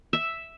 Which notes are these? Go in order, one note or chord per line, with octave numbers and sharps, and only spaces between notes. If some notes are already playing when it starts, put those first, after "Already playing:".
E5